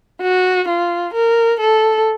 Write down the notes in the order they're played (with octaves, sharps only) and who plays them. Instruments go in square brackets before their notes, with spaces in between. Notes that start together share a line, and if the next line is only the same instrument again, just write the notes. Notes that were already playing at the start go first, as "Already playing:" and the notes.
[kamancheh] F#4
F4
A#4
A4